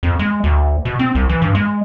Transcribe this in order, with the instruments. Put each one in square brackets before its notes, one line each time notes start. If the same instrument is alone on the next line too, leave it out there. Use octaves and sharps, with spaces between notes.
[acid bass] F2
G#3
D2
B2
C4
C2
E3
G2
G#3